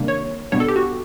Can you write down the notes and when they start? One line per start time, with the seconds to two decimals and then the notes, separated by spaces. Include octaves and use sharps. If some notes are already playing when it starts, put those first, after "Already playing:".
Already playing: C3 D#3 G3 A#3 D4
0.08 C#5
0.52 B2 G3 B3 D4 C#5
0.60 A4
0.69 G4
0.76 F#4